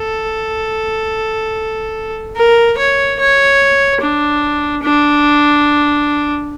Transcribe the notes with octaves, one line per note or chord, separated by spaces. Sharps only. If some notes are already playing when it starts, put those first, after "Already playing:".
Already playing: A4
A#4
C#5
C#5
D4
D4